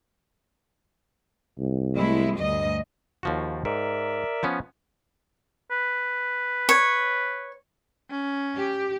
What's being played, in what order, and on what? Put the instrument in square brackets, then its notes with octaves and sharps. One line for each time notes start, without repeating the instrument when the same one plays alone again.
[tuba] C2
[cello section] G#3 A3 E4
D2 G2 D#5
[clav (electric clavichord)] D#2 F3 F#4
[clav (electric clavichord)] G#2 [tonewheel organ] A#4 D5 E5
[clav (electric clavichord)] F3 B3 C#4
[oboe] B4
[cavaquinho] C#5
[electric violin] C#4
[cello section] G4